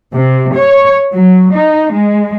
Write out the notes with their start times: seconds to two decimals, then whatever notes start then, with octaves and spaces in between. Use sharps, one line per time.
0.13 C3
0.54 C#5
1.13 F#3
1.52 D#4
1.92 G#3